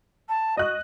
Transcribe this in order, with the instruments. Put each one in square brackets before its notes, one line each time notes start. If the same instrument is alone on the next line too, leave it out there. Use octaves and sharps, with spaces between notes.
[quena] A5
[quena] F#4 [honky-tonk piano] D#5 F#6